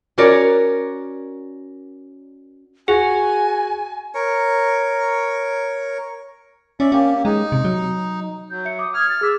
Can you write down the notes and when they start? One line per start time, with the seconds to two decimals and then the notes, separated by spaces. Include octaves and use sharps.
0.18 C#4 F#4 A#4 C#5 D5 A#5
2.88 F#4 G#4 G#5
4.14 A#4 C#5
6.80 C#4 D5 E5
6.92 A#3 C#4 G4
7.25 G#3 D#4
7.52 C3
7.65 F#3
8.50 F#3 G6
8.65 E5 C#7
8.79 D6 D#6
8.94 D#6 F6 G#6
9.09 A6
9.21 G#4 D6 E6 B6